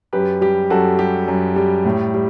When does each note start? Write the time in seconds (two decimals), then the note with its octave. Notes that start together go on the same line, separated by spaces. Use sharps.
0.13 F#2 G4 B4
0.41 G3 G4
0.70 F#2 F#4 A4
0.98 G3 G4
1.28 F#2
1.56 G3
1.85 A2
2.14 G3